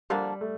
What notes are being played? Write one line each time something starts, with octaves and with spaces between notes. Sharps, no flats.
D3 F3 G3 A#3 D4
A3